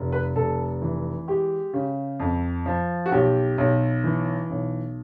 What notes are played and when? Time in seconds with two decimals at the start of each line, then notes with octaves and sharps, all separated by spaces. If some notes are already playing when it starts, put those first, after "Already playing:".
Already playing: F1
0.12 B4
0.36 F1 A4
0.82 E3
1.28 G#3 G4
1.73 C#3
2.20 F2
2.66 F3
3.06 F#4
3.12 B1 G4
3.58 B1
4.04 E3
4.50 B1